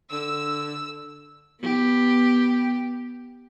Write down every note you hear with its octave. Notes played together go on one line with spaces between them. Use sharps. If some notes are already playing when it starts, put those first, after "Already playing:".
D3 E6
B3 G4